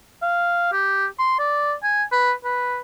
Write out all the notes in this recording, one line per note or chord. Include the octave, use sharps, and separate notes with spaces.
F5
G4
C6
D5
G#5
B4
B4